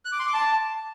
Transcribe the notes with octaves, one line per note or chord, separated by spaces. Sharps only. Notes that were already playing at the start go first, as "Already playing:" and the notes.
F#6
D6
C6
D6
A5